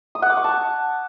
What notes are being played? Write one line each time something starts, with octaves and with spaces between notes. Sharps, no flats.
D#6
F#5
D6
C#6
A5